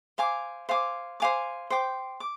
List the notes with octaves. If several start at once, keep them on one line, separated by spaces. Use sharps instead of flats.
C5 F5 G#5 D6
C5 F5 G#5 D6
C5 F5 G#5 D6
C5 G5 D6
D6